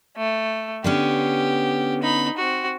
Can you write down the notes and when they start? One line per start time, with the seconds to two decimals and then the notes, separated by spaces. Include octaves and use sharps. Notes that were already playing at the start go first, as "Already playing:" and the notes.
0.16 A3
0.84 D3 B3 C#4 G4
2.03 D#4 B5
2.37 C4 F#4